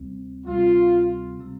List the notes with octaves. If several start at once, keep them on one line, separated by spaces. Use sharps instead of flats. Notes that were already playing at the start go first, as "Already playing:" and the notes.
Already playing: D2 C3 G3 C4
D2 C3 G3 C4 F4
C3 G3 C4